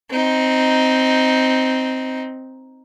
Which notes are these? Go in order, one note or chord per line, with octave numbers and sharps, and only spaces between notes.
C4 D#4